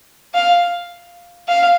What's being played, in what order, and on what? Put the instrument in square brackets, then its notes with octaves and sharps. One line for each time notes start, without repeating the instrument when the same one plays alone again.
[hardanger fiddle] F5
F5